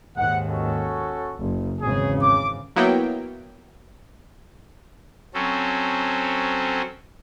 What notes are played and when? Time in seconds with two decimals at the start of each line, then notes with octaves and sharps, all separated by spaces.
0.16 D#2 G#2 D#3 F#5
0.48 C#4 F#4 A4
1.40 F#1
1.80 G#1 E2 C#3 C#4 G#4
2.22 D6
2.76 F#3 A#3 B3 E4 G5
5.34 F#3 C4 C#4 A4